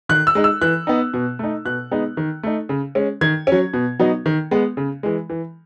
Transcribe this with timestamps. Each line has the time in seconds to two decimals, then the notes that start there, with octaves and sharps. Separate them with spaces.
0.09 D#3 F#6
0.27 E6
0.35 G#3 D#4
0.44 E6
0.61 E3 F#6
0.87 B3 D#4
1.14 B2
1.39 A3 D#4
1.65 B2 F#6
1.91 G#3 B3 D#4
2.17 D#3
2.43 A3 D#4
2.69 C#3
2.95 G#3 C#4
3.21 D#3 G#6
3.47 F#3 C#4
3.73 B2
3.99 F#3 B3 D#4
4.26 D#3
4.51 G#3 B3
4.77 C#3
5.03 E3 G#3
5.30 E3